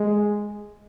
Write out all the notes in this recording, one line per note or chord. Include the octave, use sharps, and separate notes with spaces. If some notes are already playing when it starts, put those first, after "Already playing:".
Already playing: G#3